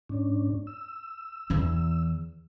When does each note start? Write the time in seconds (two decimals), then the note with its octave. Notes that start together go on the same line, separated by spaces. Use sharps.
0.09 G#2 C#4 D4
0.67 E6
1.50 E2 E3